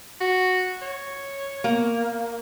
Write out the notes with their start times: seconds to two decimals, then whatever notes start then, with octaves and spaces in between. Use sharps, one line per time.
0.21 F#4
0.82 C#5
1.64 A#3